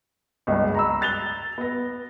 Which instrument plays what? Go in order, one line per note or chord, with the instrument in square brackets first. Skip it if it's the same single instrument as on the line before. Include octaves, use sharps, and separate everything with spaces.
[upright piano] G1 C#2 G#3
A#5 B5 E6
F#6 A6 F7 G7
B3 A#6